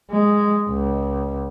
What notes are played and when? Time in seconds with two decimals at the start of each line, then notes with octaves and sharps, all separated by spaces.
0.11 G#3
0.69 C#2